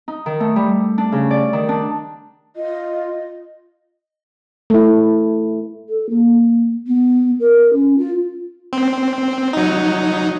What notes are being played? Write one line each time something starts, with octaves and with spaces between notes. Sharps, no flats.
D#4
D#3
A3
G3
D4
C#3
D5
D#3
D4
F4 D#5
A3 E4
A4
A#3
B3
A#4
C#4
F4
C4
F#3 D#4